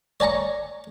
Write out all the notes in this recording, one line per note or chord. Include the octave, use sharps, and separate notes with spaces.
C#5 D5 G#5 A#5 C#6